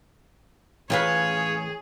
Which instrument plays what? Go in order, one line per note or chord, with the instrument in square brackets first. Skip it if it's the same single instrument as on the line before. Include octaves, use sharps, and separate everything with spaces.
[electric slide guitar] A2 E3 A#5 [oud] C#4 F4 B4 [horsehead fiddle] G#4 [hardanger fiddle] C#5